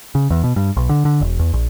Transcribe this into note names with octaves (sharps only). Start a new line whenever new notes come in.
C#3
E2
B2
G2
B1
D3
D3
E1
E2
A#1